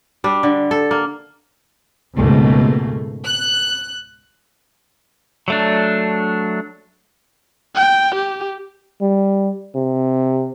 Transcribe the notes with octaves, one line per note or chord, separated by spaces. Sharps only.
G3 D4
D3
A4
A#3
C#2 G#2 B2 A3 A#3
F#6
F#3 A3 D4
G5
G4
G3
C3